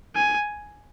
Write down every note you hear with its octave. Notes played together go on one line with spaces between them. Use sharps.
G#5